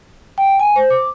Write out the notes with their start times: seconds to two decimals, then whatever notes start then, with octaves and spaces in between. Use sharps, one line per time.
0.38 G5
0.60 G#5
0.76 C5
0.90 D6